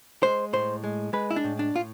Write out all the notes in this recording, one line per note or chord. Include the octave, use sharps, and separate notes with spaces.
G#3 C5
A2 C5
G#3
G#3 B4
E4
D4
A2
D4
A2 F4